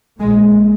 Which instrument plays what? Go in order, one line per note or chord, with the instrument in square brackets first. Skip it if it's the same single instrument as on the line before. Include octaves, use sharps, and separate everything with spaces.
[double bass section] A#1 A#2 G#3